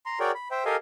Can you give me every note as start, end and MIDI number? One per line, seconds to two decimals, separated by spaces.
0.06 0.19 82
0.06 0.19 84
0.20 0.31 66
0.20 0.31 68
0.20 0.31 70
0.20 0.31 73
0.20 0.31 74
0.20 0.31 79
0.35 0.48 83
0.51 0.64 72
0.51 0.64 76
0.51 0.64 79
0.65 0.76 67
0.65 0.76 69
0.65 0.76 70
0.65 0.76 75
0.65 0.76 77
0.65 0.76 80